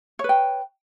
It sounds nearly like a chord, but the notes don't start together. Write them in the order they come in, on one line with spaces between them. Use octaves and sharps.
C#5 B4 G5